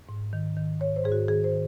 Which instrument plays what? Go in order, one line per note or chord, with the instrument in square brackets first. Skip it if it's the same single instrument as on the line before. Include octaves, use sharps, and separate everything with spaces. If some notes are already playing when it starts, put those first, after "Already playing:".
[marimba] G#2
D#3
D#3
G#2 C#5
C5
G#2 G#4
F#4
D#3 G#4
C5
D#3